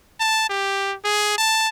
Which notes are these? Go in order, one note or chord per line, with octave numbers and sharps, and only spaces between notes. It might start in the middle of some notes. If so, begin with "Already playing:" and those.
A5
G4
G#4
A5